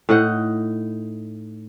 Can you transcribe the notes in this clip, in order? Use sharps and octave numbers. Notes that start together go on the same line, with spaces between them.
A2 D#4 D#5 F#5